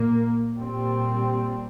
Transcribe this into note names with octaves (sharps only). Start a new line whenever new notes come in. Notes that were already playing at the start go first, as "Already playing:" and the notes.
Already playing: A#2 A#3
A#2 G3 C4